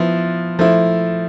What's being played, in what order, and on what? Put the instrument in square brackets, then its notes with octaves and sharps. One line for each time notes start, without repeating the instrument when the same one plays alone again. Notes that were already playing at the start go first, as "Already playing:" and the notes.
Already playing: [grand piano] F3 B3 E4
F3 A3 E4